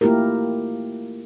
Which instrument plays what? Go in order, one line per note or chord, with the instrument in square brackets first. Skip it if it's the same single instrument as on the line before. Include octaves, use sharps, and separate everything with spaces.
[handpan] A3 A#3 E4 F4 G4 A#4